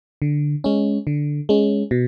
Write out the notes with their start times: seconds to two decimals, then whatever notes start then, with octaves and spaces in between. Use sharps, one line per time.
0.22 D3
0.64 G#3 C#4
1.07 D3
1.49 G#3 C#4
1.91 B2